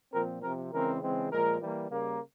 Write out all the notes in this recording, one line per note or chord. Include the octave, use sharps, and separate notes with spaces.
A#2 F3 C4 A#4
C3 F3 C4 A#4
C#3 E3 G#3 C4 A#4
C#3 E3 G#3 C4
A#2 F3 G#3 A#4
E3 G3 A#3
C#3 G3 A#3